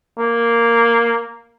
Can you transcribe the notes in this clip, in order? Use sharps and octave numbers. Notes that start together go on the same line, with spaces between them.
A#3